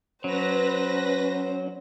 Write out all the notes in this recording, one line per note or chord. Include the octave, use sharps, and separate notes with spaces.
F#3 C#4 B4 C5 A#6